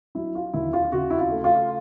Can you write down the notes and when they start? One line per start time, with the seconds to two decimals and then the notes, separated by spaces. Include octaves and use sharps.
0.15 F#3 E4
0.35 F4
0.54 D#2 E4
0.73 F4
0.92 C#3 F#4
1.10 E4
1.18 F4
1.31 A3
1.44 F4